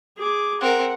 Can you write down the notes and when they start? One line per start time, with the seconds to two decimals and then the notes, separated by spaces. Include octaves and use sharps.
0.18 G#4 D6
0.61 C4 A#4 F#5